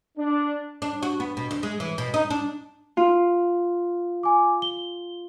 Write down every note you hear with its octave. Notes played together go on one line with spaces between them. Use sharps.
D4
D4
F#4
B3
B2
D2
G#3
E3
B2
D#4
D4
F4
G#5 D6
G7